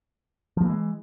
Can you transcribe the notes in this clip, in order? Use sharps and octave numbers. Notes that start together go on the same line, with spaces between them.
E3 F3 G#3 A#3